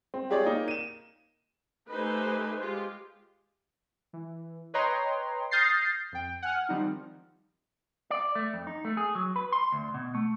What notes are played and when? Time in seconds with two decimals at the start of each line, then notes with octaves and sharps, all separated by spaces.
0.14 C4
0.30 F4 G4 G#4 C#5 D5
0.45 A#3 D#4
0.68 D#7 E7
1.91 A3 D#4 G4 B4 C5 G#5
2.57 G#3 F4 G4
4.13 E3
4.74 B4 C#5 D#5 G5 A#5 C6
5.51 D#6 F6 G6 A6 A#6 C7
6.12 F2 G5
6.42 F#5 G#5 F6
6.69 D#3 F3 G3 C4 D#4
8.10 D5
8.35 A3
8.54 F2
8.67 D#4
8.85 A3
8.97 G#4
9.15 F#3
9.36 B4
9.52 C6
9.72 D2
9.94 B2
10.15 A3